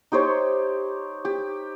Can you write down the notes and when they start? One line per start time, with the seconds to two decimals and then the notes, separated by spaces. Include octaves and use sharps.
0.12 D#4 G4 C5 C#5
1.25 G4